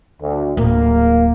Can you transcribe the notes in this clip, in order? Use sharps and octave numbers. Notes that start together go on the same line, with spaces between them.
D2
D1 A#3 E4